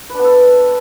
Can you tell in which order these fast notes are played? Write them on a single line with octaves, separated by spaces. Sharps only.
B4 D4 B3 A4